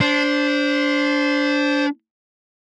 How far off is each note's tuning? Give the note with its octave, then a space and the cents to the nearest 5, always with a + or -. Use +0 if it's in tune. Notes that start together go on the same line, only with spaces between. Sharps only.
D4 -20 C5 +0